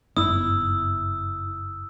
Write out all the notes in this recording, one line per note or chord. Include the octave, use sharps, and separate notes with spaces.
F#1 G2 B3 E4 D#6 E6